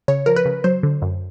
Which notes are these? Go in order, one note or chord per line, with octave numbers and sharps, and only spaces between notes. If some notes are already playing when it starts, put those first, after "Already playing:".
C#3 C#5
F3 A#4
B4
C#3
F#3 C5
D3
F#2